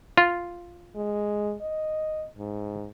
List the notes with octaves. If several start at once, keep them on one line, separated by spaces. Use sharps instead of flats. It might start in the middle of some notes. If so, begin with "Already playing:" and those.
F4
G#3
D#5
G#2